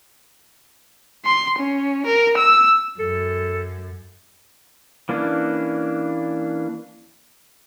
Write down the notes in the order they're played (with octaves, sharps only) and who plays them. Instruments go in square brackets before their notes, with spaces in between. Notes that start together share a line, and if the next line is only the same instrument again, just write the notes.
[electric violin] C6
C#4
A#4
E6
[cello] F#2 [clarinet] A4
[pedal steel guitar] E3 A#3 C#4 D4